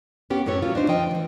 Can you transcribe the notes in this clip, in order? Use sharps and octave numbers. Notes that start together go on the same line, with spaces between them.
B3 C#4 G4
F#2 A2 C#4 A4 B4 C#5
D#2 F#3 F4
D4 D#4 C5
F2 F3 D#5 G5
E3 F3